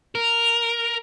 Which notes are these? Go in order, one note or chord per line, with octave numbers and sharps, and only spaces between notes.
A#4